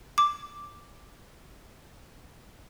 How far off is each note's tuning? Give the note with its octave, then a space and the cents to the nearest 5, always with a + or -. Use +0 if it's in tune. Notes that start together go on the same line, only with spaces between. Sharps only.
D6 +0